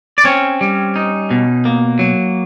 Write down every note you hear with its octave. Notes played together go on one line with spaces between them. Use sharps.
D5
C4 C#4 C#5
G3
D#4
B2
A#3
F#3